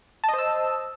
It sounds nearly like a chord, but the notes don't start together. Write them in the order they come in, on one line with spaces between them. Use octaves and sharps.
A5 D#5 C5 E6